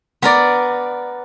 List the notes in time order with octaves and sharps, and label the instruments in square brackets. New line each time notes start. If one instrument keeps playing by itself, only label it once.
[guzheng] B3 A#4 D5